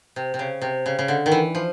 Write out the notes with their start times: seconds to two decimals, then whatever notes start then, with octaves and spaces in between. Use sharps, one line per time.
0.16 C3
0.34 C3
0.39 C#3
0.62 C3
0.86 C#3
0.99 C#3
1.08 D3
1.26 D#3
1.32 E3
1.55 F3